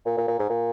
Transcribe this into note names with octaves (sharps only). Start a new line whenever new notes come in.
A#2
A#2
A#2
G#2
A#2